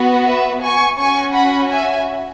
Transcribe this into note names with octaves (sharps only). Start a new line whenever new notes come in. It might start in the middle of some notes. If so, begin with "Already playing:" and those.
Already playing: B3 F#4
B4 E5
G#5 C#6
C#4 F#4 G#5 C#6
F#5 B5
E5 G#5